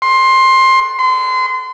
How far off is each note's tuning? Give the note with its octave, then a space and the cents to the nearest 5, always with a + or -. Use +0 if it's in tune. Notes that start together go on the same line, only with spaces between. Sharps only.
C6 +15
C6 -30